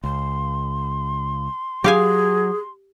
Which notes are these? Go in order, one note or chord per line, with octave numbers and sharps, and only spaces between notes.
C#2 C6
F#3 G4 G#4 F5 G#5